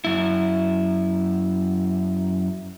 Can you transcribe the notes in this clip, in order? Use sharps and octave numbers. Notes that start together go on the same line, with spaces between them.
F#2 E4